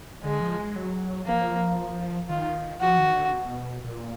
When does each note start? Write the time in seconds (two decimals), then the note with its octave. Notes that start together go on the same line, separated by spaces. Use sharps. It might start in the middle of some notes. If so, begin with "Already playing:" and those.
0.23 D3 G#3
0.41 F3
0.58 G#3
0.76 F#3
1.27 F3 A#3
2.29 D#3 F4
2.81 F3 F#4
2.98 D#3
3.16 D3
3.32 B2
3.84 A#2